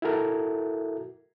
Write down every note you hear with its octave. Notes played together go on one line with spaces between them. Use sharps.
E4 F#4 A4 A#4 E5